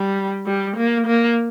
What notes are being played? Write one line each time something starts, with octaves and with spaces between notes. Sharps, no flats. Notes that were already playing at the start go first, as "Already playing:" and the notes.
Already playing: G3
G3
A#3
A#3